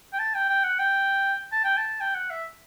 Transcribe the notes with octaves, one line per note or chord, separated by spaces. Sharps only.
G5
A5
G5
G5
F#5
G5
A5
G5
A5
G5
F#5
E5